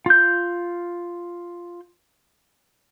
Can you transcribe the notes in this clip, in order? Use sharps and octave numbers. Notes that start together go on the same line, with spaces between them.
F4 G6